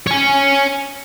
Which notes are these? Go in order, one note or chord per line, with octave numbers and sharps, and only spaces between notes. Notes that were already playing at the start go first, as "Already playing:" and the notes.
C#5 G#5